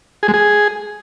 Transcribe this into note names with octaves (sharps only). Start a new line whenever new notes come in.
G#4
G#3
G#4